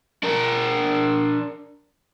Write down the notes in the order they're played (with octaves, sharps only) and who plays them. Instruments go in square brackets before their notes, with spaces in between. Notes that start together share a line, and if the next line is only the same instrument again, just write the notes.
[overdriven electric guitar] D4 A#4